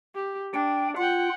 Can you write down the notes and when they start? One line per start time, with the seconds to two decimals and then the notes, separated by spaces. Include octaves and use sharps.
0.15 G4
0.54 D4 G5
0.97 F4 F#5 G5